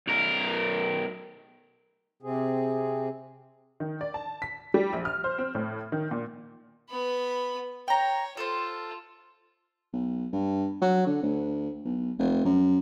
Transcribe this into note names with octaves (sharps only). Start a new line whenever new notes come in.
B1 A#4
C3 C4 G#4
D#3
D5
A5
B6
G3
A#1
F6
C5
C4
A2
D#3
A#2
B3 B5
C#5 G5 A#5
F4 A4 C5
B1
G2
F#3
D3
D2
B1
F1
F#2